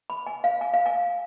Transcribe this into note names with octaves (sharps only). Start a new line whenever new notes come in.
B5
G#5
F5
G#5
F5
G#5